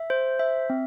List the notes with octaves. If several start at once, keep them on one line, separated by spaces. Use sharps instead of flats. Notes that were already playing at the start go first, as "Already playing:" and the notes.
Already playing: E5
C5
E5
C4